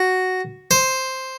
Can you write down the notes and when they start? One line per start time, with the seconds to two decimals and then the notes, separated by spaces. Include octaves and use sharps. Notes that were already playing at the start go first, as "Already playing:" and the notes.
Already playing: F#4
0.71 C5